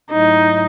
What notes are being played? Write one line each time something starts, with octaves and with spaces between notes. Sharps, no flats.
G#2 F#3 A3 D#4 E4